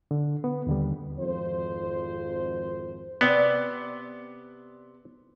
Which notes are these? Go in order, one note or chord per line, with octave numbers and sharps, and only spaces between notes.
D3
B3
D#2 D3 G3
G#1 F2 C5
C3 B3 D5 G5